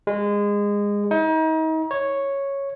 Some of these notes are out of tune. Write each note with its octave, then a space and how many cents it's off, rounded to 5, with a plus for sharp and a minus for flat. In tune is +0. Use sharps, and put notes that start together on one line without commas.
G#3 -20
D#4 +35
C#5 -5